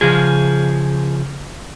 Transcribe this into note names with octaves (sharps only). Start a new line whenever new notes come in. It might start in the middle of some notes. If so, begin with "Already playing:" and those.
C#3 F3 G#4